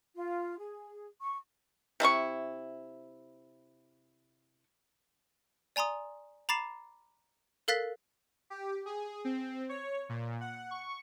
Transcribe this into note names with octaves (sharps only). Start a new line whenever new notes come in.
F4
G#4
C#6
C3 E4 F4 C#6
D5 G#5 A#5 C6 D#6
A#5 B5 D6 A6 C7 E7
A4 A#4 F5 F#6 A6 B6
G4
G#4
C4
C#5
A#2
F#5
C#6